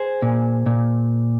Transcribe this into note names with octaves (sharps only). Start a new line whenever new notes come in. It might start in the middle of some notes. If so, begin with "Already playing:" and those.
Already playing: G#4 C5
A#2
A#2